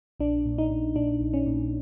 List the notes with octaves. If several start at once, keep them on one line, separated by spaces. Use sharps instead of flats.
A#1 D4
A#2
D#4
A#2
A#2 D4
A#1
C#4
A#2